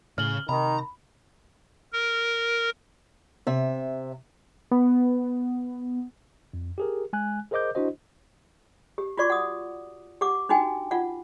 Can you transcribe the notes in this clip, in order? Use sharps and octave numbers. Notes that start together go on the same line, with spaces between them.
A2 C#3 F6 F#7 G7
C3 D#3 A#5 B5
A#4
C3 E5
B3
F2
G4 G#4 A#4
G#3 G#5 F#6
G#4 A#4 C5 D#5 D6 G6
D4 E4 F#4 C5 D#5
G4
F4 F#4 D5 C#6 D6
F#5 D#6
G4 F#5 D6
D4 D#4 F#4 G5 G#5
F4 F#5